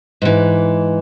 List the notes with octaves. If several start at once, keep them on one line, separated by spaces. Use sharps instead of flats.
G#2 E3